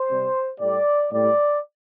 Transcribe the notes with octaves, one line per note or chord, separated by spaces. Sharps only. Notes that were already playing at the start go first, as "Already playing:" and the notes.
Already playing: C5
C3 G3
A2 G3 D5
A2 G3 D5